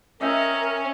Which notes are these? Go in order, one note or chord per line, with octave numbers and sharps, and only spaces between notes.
C#4 A#4 D#5 E5 G5